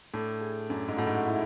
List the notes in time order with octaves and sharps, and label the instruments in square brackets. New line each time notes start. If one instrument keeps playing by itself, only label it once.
[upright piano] A2 [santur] D4
[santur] G#4
[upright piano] F#2 [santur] D4
[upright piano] G#2
[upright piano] A2 [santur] F#4
[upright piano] G#2
[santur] E4